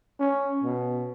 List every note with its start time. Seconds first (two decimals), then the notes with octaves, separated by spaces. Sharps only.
0.20 C#4
0.63 B2